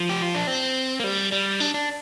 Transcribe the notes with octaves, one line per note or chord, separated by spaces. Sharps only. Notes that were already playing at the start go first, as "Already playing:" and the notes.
Already playing: F3
G4
F4
D4
C4
A#3
G3
G3
D4
D4